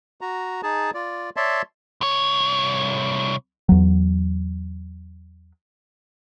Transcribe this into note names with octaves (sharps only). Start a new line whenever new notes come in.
F#4 A#5
D#4 G#4 A5
F4 D5
C#5 D5 E5 A5 C6
C2 C#5
E2 F#3